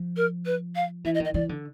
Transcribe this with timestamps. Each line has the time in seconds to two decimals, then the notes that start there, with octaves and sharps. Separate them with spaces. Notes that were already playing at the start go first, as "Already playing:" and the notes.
Already playing: F3
0.17 A#4
0.46 B4
0.76 F5
1.04 E3 E5
1.14 D#5
1.20 D#3
1.25 D#5
1.34 E3 D5
1.49 D3